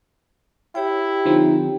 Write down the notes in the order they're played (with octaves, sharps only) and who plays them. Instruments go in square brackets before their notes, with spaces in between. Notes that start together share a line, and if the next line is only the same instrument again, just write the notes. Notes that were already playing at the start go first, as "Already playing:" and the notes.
[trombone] E4 [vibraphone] G4 C#5 G5
[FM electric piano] D3 F3 C4 [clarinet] D#4